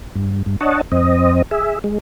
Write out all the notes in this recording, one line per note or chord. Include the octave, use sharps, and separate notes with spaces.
G2
G2
D4 C#5 D#5 F#5 A5
F2 C4 D#5
G#4 E5
G#3